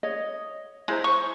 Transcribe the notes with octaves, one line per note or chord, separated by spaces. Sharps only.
C#5 D#5
G#3 E4 C5 A#5
C#6